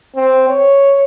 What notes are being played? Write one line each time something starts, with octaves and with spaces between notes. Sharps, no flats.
C4
C#5